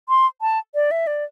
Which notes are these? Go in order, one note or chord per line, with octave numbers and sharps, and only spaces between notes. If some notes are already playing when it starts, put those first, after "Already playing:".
C6
A5
D5
E5
D5